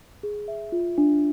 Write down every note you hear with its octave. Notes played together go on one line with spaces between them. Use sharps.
G#4
E5
F4
D4